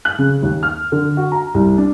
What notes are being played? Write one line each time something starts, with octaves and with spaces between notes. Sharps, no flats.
F#6
C#3
D#2
F6
D3
F#4
A#5
C2
D4